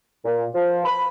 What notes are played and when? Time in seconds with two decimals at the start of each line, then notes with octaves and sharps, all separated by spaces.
0.25 A#2
0.55 F3
0.85 B5